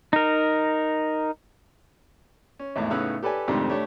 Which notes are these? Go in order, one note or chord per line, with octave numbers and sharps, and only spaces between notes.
D#4 A#4
C#4
G#1 E2 A2
A2 C#3 B3 D#4 E6 F#6
G4 A4 B4 D5 G#5
F2 G#2 C3 D#3 A3 D4
A3 D4 G4 C#5